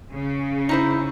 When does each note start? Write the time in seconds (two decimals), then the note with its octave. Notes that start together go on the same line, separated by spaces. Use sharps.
0.13 C#3
0.69 D#4 E4 C5